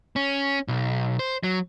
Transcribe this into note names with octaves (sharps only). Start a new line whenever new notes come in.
C#4
B1
C5
F#3